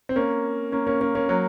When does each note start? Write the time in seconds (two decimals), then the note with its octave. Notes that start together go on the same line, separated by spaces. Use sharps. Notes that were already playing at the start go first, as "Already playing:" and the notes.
0.09 C4
0.16 A#3 C#4
0.72 A#3 C#4
0.87 A#3 C#4
1.01 A#3 C#4
1.15 A#3 C#4
1.29 F#3 A#3